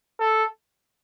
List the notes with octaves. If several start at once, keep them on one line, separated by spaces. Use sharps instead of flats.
A4